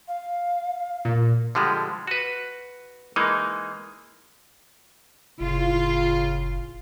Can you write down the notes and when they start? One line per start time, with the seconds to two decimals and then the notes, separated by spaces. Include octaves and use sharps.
0.08 F5
1.05 A#2
1.55 D3 F3 G3 G#3
2.07 F#4 B4
3.16 E3 G#3 A#3 D#4
5.40 F#1 A2 C#3 F4